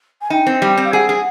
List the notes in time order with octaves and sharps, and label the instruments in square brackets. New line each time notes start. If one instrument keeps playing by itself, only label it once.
[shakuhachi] G#5
[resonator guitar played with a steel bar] D#4 [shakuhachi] G5
[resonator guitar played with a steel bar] C4
G3
C4
[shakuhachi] F5
[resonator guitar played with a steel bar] G#4 [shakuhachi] F#5
[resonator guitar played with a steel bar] G#4